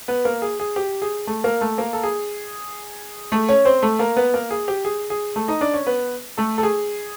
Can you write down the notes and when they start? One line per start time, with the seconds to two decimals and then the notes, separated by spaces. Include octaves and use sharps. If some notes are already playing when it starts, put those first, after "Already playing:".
0.08 B3 B4
0.25 A#3 A#4
0.42 G#4
0.60 G#4
0.76 G4
1.02 G#4
1.27 A3 A4
1.44 A#3 A#4
1.61 A3 A4
1.78 A#3 A#4
1.93 A4
2.03 G#4
3.32 A3 A4
3.49 C#4 C#5
3.65 C4 C5
3.82 A3 A4
3.99 A#3 A#4
4.17 B3 B4
4.34 A#3 A#4
4.51 G#4
4.68 G4
4.85 G#4
5.10 G#4
5.36 A3 A4
5.48 D#4 D#5
5.61 D4 D5
5.74 C#4 C#5
5.87 B3 B4
6.37 A3 A4
6.58 A4
6.63 G#4